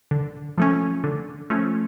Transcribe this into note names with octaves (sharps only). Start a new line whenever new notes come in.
D3
F3 A3 C#4
D3
F3 A3 C#4